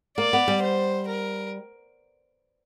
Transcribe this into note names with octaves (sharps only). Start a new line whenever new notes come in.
A#3 D5
B3
G3
C5
A#4